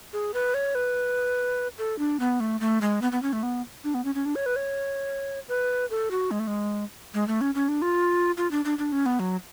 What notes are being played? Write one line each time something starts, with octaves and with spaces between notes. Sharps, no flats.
G#4
B4
C#5
B4
A4
D4
B3
A3
A3
G#3
B3
B3
C#4
A3
B3
D4
B3
C#4
C#4
D4
C#5
B4
C#5
B4
A4
F#4
G#3
A3
G#3
G#3
A3
C#4
C#4
D4
F4
F4
D4
D4
D4
C#4
B3
F#3